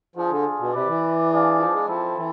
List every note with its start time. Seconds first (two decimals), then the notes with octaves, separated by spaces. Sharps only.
0.16 F3 D4 F4 G#4
0.30 D3
0.59 B2
0.73 C3 E4 B4 D5
0.87 E3
1.30 D4 G#4 D5 F5
1.58 F3
1.73 G#3
1.87 F3 C4 E4 A4
2.15 E3